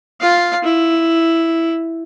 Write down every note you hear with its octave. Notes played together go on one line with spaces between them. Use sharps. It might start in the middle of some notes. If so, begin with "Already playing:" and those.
F4 F5
E4